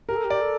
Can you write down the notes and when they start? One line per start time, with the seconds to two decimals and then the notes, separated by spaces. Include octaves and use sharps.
0.09 G4 A#4
0.16 A4
0.25 G4
0.30 D5
0.41 A4